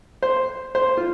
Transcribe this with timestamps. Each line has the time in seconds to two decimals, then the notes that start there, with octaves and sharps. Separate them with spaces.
0.22 C5
0.75 C5
0.97 F4